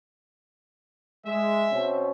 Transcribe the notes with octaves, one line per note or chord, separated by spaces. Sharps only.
G#3 E5
B2 C4 C#4